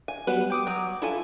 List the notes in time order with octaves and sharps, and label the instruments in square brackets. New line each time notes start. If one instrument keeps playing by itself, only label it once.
[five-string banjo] G#5
[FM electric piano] F#3 G3 B3 [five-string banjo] B4
[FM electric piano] G5 D6 D#6
[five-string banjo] F#3
[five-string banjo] E4 A4 G#5 [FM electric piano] F4